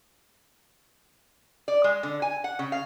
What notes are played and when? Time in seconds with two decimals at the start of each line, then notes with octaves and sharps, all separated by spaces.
1.68 D5
1.84 G#3
2.03 D3
2.22 G#5
2.44 F#5
2.59 C#3
2.72 F5